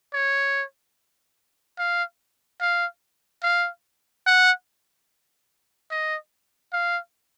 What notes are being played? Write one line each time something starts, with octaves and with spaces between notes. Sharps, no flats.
C#5
F5
F5
F5
F#5
D#5
F5